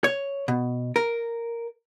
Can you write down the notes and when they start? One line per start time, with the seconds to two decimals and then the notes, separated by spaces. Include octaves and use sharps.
0.04 C#5
0.48 B2
0.96 A#4